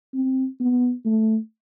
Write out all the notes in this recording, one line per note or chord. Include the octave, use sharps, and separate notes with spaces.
C4
B3
A3